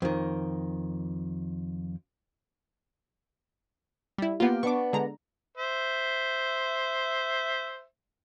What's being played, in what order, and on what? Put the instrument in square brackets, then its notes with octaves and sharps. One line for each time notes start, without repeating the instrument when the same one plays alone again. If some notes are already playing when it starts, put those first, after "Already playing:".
[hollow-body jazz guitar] F2 D#3
[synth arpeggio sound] G3 E4
[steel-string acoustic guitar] A#3 G4 F5 [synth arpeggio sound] B3 F4
[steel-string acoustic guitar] B3 D4 [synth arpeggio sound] C#6 D6
[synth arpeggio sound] D3 G#3 A#5
[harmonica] C5 E5